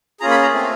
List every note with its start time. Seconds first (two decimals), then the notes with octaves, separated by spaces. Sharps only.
0.20 A#3 C#4 F4 G#4 A#5
0.31 B5
0.42 A#5
0.53 A3 C4 F4